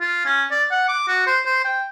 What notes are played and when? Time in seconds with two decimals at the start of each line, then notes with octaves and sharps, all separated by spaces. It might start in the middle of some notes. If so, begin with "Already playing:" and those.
0.01 F4
0.25 C#4
0.51 D5
0.71 F#5
0.88 D6
1.08 F#4
1.26 C5
1.46 C5
1.65 G5